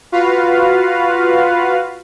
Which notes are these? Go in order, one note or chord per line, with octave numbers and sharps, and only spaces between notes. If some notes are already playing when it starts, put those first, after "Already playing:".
F4 F#4 B4 F5